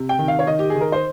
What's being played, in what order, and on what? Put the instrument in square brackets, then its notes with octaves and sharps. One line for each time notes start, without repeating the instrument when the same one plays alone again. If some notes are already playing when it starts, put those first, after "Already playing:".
Already playing: [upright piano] C3
G5
D#3
F5
C#5
D#3 D#5
G4
D#3 G#4
A#4
C5